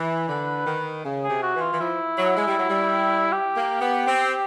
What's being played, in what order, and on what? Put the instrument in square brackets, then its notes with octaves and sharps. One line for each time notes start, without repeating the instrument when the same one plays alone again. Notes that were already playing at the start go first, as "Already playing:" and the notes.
Already playing: [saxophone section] E3 [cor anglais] B4
[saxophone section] D3
D#3
C#3
[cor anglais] G#4
[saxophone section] C3
[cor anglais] F#4
[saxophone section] E3
[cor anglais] F4
[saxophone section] E3
[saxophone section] F3 [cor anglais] E4
[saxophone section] F#3
G#3
G3
F#3
G3
[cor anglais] G4
[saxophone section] A#3
B3
C4